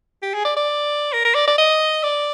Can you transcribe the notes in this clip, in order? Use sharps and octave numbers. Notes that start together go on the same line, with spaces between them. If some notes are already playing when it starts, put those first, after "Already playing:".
G4
G#4
D5
D5
A#4
A#4
D5
D5
D#5
D5